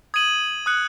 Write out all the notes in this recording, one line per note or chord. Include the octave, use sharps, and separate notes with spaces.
D#6 G#6 D#7 F#7
D#6 F#6 C#7 F#7